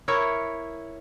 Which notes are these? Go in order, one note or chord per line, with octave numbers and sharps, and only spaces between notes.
E4 A#4 C#5